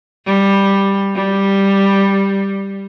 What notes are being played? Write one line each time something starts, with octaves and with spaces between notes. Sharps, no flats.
G3
G3